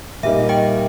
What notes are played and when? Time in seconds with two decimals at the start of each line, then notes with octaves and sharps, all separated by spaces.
0.23 A#2 G3 A#3 D#4 E5
0.49 D#5 G5